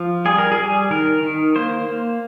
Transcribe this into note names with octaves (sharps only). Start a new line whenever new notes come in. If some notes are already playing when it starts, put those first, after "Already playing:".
Already playing: F3
G3 G#4
A#4
G#4
G3
D#3 A#4
D#3
A#3 C5
A#3